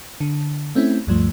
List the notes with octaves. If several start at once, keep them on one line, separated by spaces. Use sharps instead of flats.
D3
A3 C4 C#4 E4
D2 G2 F3 A3